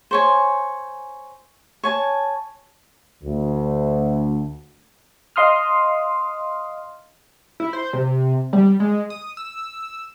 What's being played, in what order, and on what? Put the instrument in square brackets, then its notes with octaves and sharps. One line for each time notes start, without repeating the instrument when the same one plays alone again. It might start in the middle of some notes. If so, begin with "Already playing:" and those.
[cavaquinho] C5 C#5 G#5
C#5 G#5 A5
[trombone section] D2
[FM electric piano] D#5 F5 C6 D#6 F6
[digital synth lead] E4
C5
C3
G3
G#3
D#6
E6